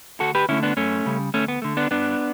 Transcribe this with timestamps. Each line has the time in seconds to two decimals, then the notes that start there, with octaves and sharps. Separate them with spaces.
0.20 D2 F#4 A4
0.35 G4 B4
0.49 D3 A3 C#4 E4
0.63 B3 D4
0.77 F#2 A3 C#4
1.06 C#3 G3
1.34 D2 A3 C#4
1.48 B3
1.62 D3 A3
1.77 B3 D4
1.91 G2 B3 D4